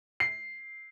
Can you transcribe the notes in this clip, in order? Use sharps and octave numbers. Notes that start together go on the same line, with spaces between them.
C7